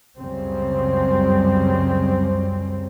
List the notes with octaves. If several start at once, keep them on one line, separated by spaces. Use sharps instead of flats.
C#2 F#2 C#3 G3 C4